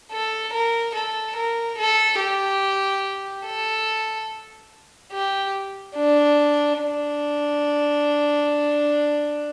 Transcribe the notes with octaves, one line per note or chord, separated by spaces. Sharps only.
A4
A#4
A4
A#4
A4
G4
A4
G4
D4
D4